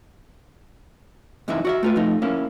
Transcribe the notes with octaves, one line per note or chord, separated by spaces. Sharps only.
C#2 F#2 C3 E3 D#4 E5
F#4 D5 E5
A3 F4 B4
F3 A3 D#4
A#3 C#4 E4